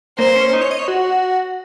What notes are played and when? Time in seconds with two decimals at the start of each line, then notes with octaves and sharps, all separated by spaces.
0.18 A#3 C5
0.36 C#4
0.53 D#4
0.62 C#5
0.71 D#5
0.79 C#5
0.88 F#4